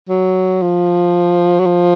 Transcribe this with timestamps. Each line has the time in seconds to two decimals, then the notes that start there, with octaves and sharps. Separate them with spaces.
0.09 F#3
0.62 F3
1.59 F#3
1.66 F3